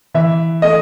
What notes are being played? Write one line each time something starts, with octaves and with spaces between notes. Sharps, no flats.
E3 E5
A3 D#5